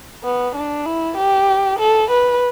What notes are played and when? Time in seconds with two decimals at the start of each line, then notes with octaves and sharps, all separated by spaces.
0.24 B3
0.55 D4
0.86 E4
1.17 G4
1.79 A4
2.10 B4